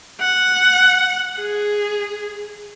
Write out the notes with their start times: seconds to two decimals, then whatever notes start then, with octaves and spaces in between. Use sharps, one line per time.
0.21 F#5
1.39 G#4